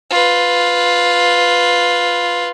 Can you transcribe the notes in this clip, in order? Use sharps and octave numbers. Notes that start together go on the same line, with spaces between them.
F4 B4